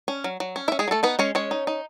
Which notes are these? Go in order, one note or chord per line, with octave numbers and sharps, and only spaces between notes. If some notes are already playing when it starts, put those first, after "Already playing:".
C#4
F#3
F#3
C#4
E4 E5
C#4
G#3 G#4
F#3
A3 A4
B3 D#4 B4
G#3 C#4 C#5
G#3 C#4 C#5
D#4
D#4